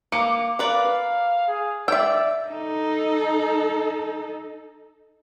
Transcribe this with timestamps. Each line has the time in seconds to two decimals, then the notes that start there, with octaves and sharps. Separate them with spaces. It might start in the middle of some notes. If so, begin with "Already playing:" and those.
0.12 A#3 D6 C#7
0.59 A#4 B4 D5 F5
1.48 G#4
1.88 D5 E5 G5 E6
2.48 D#4 A4